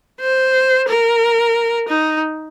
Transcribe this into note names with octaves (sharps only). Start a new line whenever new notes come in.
C5
A#4
D#4